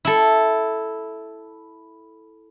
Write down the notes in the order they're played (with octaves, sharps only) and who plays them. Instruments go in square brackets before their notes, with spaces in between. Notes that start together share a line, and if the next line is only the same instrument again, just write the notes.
[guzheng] E4 A4